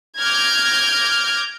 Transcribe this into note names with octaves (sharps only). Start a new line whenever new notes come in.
D6 F6 G6 G#6 A#6